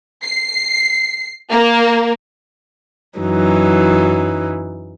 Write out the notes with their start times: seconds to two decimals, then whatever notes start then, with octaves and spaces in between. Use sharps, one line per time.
0.23 C7
1.50 A#3
3.19 F#2 E3 F#3 D#4